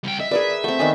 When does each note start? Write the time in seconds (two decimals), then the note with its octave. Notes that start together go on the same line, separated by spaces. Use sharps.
0.04 C2 G5
0.20 D#5 E5
0.31 G#4 A#4 B4 D5
0.64 A3 C4 F#5
0.79 D#3 B3 D4 G#5